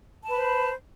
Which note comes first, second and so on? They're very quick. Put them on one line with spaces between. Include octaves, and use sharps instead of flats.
A5 B4 B5 C5